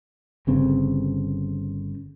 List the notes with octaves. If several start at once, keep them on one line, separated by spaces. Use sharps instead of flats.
G1 C#3 C4